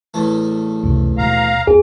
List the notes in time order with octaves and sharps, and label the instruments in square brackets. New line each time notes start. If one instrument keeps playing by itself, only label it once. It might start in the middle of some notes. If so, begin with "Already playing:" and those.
[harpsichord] A1 E2 A3
[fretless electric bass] C#2 F#2 C3
[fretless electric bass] D#2 B2 G#3 [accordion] F5 A#5
[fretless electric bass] E2 [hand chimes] G#4